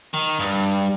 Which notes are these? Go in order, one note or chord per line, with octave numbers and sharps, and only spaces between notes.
D#3
G2